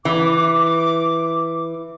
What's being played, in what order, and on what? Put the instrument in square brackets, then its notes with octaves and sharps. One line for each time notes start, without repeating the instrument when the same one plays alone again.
[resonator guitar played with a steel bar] E3 [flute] D6